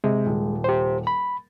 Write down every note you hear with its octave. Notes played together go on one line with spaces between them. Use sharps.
C3 G#3
D#1
G4 C5
B5